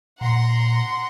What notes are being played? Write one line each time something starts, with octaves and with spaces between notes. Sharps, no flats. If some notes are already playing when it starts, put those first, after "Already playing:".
A#2 F#5 A#5 C6